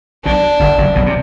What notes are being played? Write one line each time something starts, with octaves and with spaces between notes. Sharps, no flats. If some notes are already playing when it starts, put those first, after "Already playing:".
B1 B2 D4
G1 G2
F#1 F#2
B1 B2
C3